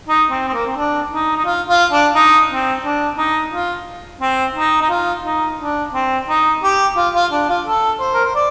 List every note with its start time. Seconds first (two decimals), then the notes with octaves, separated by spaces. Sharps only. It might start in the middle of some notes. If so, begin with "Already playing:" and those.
0.08 D#4
0.31 C4
0.48 C4
0.54 A#3
0.66 C4
0.76 D4
1.11 D#4
1.36 D#4
1.45 F4
1.69 F4
1.92 D4
2.15 D#4
2.49 C4
2.84 D4
3.17 D#4
3.52 F4
4.21 C4
4.55 D#4
4.82 D#4
4.90 F4
5.24 D#4
5.60 D4
5.94 C4
6.29 D#4
6.63 G4
6.97 F4
7.14 F4
7.32 D4
7.49 F4
7.66 A4
8.00 C5
8.14 A#4
8.25 C5
8.35 D5